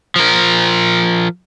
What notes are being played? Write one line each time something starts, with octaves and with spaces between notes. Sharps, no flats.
F3 A#4